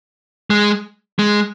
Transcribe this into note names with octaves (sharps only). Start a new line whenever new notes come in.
G#3
G#3